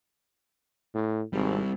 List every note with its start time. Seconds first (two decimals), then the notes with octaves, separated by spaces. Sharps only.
0.95 A2
1.33 G#1 G3 C4